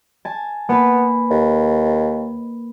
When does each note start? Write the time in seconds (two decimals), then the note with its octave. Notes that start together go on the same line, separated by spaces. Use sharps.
0.25 G#5 A5
0.69 A#3 B3 B4
1.30 D#2